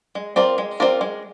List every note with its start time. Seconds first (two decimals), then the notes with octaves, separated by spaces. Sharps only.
0.15 G#3
0.36 C4 F4 A#4 D5
0.58 G#3
0.80 C4 F4 A#4 D5
1.01 G#3